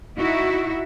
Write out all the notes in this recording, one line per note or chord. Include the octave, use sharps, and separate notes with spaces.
D#4 E4 F#4 E5